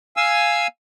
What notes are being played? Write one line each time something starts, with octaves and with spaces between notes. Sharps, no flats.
F5 G#5 E6